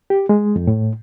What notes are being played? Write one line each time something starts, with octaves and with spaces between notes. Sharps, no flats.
G4
G#3
F2
A2